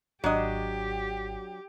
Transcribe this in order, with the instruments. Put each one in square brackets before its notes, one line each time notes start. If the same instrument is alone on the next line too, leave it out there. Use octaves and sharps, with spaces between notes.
[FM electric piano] G#1 [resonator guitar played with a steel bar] F#3 D4 D#5 [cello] G4